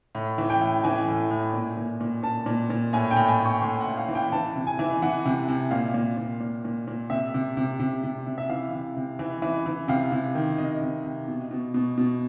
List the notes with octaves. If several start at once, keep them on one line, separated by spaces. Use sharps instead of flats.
A2
E3
G5
A2
E3 G#5
A2
A2
A#2
A#2
A#2
A#2 A5
A#2
A#2
A2 G#5
G5
A2
G#5
A2
C#6
A2 C6
F#5
A2
F5
E3
G5
E3 A5
C3
G#5
E3
E3 F#5
C3
C3
A#2 F5
A#2
A#2
A#2
A#2
A#2
C3 E5
C3
C3
C3
C3
C3
E5
E3 F5
C3
C3
E3
E3
E3
C3 F5
C3
D#3
C3 D#5
C3
C3
B2
B2
B2
B2